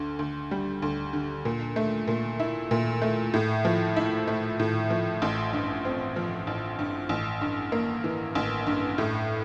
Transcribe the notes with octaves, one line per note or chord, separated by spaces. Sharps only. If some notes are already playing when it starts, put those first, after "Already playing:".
Already playing: D2 D3
D2
G3
D2
D3
A#2
A3
A#2
E4
A#2
A3
A2
F3
E4
A3
A2
F3
A1
G2
C4
F3
A1
G2
A1
G2
A#3
E3
A1
G2
A2